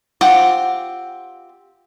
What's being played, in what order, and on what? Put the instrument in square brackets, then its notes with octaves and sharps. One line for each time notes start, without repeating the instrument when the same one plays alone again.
[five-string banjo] C4 F4 G4 F#5